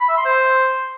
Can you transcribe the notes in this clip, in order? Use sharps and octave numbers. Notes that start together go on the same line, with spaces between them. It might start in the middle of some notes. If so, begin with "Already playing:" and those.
B5
E5
C6
C5